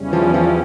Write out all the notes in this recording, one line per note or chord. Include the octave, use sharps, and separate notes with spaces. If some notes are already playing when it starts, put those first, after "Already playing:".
Already playing: E2 C#3 E3 G3 C#4
F3
F3